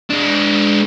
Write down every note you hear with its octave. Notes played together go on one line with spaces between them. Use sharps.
G#3 D4